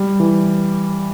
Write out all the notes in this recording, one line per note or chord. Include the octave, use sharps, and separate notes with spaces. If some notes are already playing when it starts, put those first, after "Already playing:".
Already playing: G3
E3